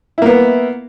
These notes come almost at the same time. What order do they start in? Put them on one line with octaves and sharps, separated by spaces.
E4 A#3 B3